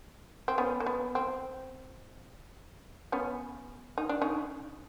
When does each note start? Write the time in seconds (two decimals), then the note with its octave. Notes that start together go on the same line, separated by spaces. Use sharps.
0.48 C4
0.58 B3 C#4
0.80 A#3
0.86 B3
1.15 C4
3.12 B3 C#4
3.98 D#4
4.09 D4
4.22 C#4 D#4